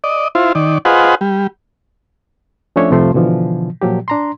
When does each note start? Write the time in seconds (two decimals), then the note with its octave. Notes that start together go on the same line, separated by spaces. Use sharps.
0.04 D5 D#5
0.35 E4 F4 C5
0.55 D#3 D5
0.85 F4 G#4 B4 C5 D#5 F#5
1.21 G3
2.76 F3 A3 C#4 D4 C#5 E5
2.91 C2 F2 C3 F3 A3 C6
3.14 B2 D3 E3 F3
3.82 A#2 F3 F#3 G4
4.08 D4 A#5 C6